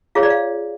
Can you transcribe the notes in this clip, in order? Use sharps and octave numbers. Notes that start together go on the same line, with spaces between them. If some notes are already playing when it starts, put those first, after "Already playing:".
F4 G#4 C#5 F5
D5
F5